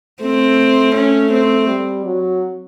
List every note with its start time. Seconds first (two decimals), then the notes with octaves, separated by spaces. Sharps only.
0.22 A3 C4
0.95 C#4
1.31 C4
1.67 G3
2.05 F#3